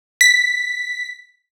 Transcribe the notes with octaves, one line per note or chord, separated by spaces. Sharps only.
B6